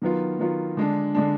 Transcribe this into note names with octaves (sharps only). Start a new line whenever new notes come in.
D#3 F#3 B3 F4
D#3 F#3 B3 F4
D3 G#3 D4
D3 G#3 D4